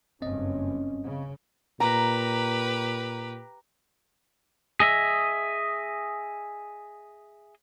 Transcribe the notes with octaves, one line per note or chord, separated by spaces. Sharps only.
F#1 G2 C4 C#4 D#5
C#3
A#2 G4 B4 A#5
G#4 D#5 E5